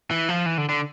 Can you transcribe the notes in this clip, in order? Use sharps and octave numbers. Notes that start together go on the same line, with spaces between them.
E3
F3
E3
D3
D3